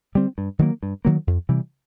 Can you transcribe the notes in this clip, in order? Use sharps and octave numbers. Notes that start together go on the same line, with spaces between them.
D3 G3 C4
G2
D#3 F#3 A#3
G2
D#3 F#3 A#3
F2
C3 E3 G3